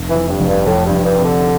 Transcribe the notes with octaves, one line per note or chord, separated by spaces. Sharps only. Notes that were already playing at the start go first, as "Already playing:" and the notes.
Already playing: F1
E3
F2
G2
F1
G2
F2 A2
G2
F1
G2
C3
D3